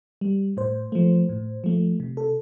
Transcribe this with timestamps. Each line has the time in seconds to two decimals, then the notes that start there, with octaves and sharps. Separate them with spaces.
0.21 G3
0.57 A2 C5
0.92 F3 A3
1.29 A2
1.64 F3 A3
2.00 C3
2.17 A4